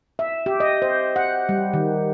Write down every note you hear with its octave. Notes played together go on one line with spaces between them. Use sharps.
E5
G4
D#5
C5
F#5
G3
D#3